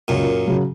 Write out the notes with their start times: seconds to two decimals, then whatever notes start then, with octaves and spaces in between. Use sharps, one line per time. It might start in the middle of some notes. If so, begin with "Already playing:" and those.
0.08 C#2 F#2 A#2
0.47 C#3 F#3